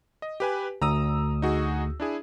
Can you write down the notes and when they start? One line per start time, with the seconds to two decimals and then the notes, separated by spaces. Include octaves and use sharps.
0.22 D#5
0.40 G4 B4 G#5
0.82 D2 A#5 D#6 E6
1.42 D#4 F#4 G#4
2.00 D4 E4 G#4